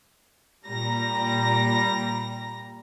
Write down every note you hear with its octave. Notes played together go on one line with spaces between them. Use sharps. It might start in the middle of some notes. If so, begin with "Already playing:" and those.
A#2 G3 A#5 A#6